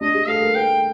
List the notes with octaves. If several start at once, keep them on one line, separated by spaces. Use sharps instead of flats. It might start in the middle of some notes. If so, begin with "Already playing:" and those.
D4 D#5
G#4
A4 F5
A#4
B4 G5